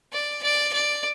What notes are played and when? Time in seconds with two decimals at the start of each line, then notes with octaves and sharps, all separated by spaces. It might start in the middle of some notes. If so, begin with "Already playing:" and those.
0.13 D5
0.43 D5
0.73 D5